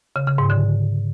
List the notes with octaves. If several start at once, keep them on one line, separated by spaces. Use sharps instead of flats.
C#3
C#3
G#2
D3